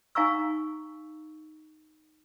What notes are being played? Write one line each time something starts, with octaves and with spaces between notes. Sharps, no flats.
D#4 F5 G#5 A#5 C#6 E6